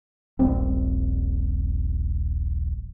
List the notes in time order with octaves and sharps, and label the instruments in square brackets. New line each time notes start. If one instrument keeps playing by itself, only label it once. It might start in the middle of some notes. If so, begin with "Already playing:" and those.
[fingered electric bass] D#1 A#1 G3 C4